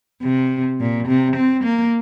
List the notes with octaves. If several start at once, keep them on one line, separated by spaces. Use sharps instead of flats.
C3
A#2
C3
C4
A#3